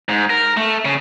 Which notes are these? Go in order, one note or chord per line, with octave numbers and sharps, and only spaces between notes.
G#2
A#4
A3
C#3